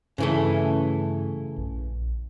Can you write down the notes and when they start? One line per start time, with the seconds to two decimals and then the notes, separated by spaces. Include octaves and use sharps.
0.18 G2 C#3 E3 A3
1.58 A#1